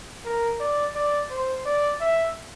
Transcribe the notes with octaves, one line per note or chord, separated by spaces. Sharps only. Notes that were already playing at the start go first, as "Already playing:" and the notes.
A#4
D5
D5
C5
D5
E5